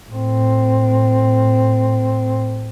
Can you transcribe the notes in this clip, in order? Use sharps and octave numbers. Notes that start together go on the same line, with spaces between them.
A2 C4